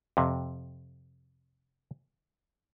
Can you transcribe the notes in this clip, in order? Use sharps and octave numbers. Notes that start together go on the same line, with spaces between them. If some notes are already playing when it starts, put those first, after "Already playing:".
F2 C3